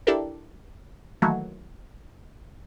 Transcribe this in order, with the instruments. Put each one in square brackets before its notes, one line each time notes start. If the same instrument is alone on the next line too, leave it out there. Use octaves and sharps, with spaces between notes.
[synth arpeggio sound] D4 E4 G4 A4 A#4
D#3 E3 F#3 A3 A#3 F#4